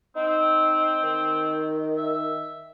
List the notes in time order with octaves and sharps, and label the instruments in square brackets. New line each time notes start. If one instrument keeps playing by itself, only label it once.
[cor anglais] C4 [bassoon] D#4
[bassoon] D#3
[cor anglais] E5